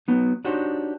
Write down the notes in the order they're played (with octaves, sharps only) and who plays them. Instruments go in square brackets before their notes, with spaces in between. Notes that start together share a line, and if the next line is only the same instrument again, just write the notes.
[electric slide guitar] F#3 B3 D#4
D4 D#4 F#4 G4 C5 C#5